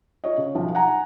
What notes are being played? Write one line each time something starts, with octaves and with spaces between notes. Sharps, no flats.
F4 C#5 D#5
C#3
B1 F3 F#4
F#5 G#5 A#5